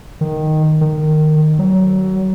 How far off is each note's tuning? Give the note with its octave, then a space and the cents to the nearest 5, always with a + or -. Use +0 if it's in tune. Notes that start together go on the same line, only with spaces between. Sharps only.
D#3 -5
D#3 -15
F#3 +25